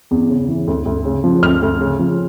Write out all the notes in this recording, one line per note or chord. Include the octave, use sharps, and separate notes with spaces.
E2
C#3
E3
D2
D2
C#3
F3
D2 F6
D2
C#3
F3